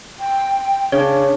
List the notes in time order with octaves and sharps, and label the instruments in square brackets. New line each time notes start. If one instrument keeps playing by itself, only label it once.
[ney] G5
[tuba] C#3 [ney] D4 [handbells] C#5